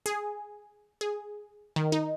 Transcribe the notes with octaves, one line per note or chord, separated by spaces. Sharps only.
G#4
G#4
D#3
D#4